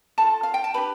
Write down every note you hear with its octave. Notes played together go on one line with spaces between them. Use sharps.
F4 A4 A5
F5
G5
A5
D4 G4 B4 B5